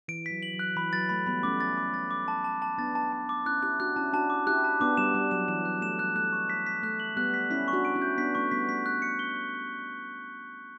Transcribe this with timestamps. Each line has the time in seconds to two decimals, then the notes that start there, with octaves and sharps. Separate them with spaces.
0.08 E3 D7
0.26 F#3 B6
0.43 F#7
0.54 F#3
0.59 F#6
0.76 E3 B5
0.93 F#3 A6
1.09 A3 B5
1.26 G3 B3 B5
1.43 A3 C#4 D6
1.60 A6
1.77 D6
1.94 A6
2.11 D6
2.28 A5
2.44 A5
2.62 A5
2.78 B3 D4 A6
2.95 A5
3.13 A5
3.29 D6
3.46 C#4 E4 F#6
3.63 E4 G4 F#6
3.80 D4 F#4 F#6
3.96 C#4 E4 A5
4.13 D4 F#4 A5
4.30 D6
4.47 E4 G4 F#6
4.64 A5
4.80 B3 D4 D6
4.97 G3 B3 E7
5.14 G3 D6
5.31 F#3 E7
5.48 E3 E7
5.65 F#3 F#6
5.82 A3 E7
5.99 G3 F#6
6.16 A3 F#6
6.33 C#6
6.50 B6
6.67 B6
6.83 A3 F#6
7.00 F#7
7.17 G3 B3 F#6
7.34 B6
7.50 C#4 E4 B6
7.68 C#6
7.73 D4 F#4
7.85 D7
7.95 C#4 E4
8.02 G6
8.18 B3 D4 B6
8.35 A3 C#4 C#6
8.51 G3 B3 B6
8.69 A3 B6
8.86 F#6
9.02 C#7
9.19 G7